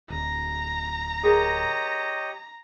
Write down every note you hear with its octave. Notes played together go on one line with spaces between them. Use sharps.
D1 A#5
G4 G#4 A#4 C#5 D#5